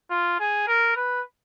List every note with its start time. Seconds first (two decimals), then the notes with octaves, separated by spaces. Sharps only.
0.10 F4
0.40 G#4
0.67 A#4
0.96 B4